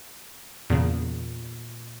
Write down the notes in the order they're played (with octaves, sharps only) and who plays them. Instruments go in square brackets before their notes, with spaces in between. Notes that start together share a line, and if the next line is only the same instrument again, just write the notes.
[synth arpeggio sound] E2 C#3 [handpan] A#2